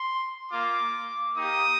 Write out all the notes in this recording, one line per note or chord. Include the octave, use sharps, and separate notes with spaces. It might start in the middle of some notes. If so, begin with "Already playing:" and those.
Already playing: C6
A#3 F4 D6
A#3 D#4 G4 D#6